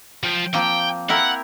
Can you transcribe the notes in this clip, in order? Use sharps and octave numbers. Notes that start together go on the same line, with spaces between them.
F3 G5
F3 A#3 C4 G5
C4 E4 A#4 F#5